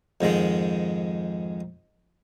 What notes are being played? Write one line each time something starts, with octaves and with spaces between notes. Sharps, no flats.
F2 G#2 D#3 G#3